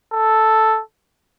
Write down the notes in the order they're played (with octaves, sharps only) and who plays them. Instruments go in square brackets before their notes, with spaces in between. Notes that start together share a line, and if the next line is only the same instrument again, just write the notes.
[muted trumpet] A4